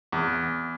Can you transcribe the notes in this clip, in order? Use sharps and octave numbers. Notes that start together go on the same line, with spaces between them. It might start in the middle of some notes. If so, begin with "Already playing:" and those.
E2